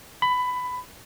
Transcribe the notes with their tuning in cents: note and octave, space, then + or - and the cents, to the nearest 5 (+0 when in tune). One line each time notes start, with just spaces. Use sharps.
B5 +15